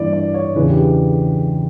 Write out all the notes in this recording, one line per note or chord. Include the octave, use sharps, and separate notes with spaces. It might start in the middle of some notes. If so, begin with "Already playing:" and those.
Already playing: G2 E3 A#3 D4 E4 D5
D5
C#5
E2 C#3 E3 B3 D4 B4
G4